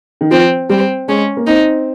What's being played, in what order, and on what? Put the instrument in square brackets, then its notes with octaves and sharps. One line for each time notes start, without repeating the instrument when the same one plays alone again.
[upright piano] D#3
[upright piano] F3 [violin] C4
[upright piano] G3 [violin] C4
[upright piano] G#3 [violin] C#4
[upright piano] A#3
[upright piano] C4 [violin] D#4